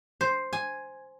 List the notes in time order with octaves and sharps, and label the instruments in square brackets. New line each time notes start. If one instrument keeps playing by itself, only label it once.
[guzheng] C5
G#5